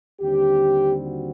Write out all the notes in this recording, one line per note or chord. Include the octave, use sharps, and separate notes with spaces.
D#2 D3 G3 C4 G4
F#4